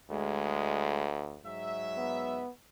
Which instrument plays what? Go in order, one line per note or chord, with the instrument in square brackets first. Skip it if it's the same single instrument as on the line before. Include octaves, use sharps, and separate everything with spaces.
[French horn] D2 [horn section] G#3
[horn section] G#2 F#3 E5
[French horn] B3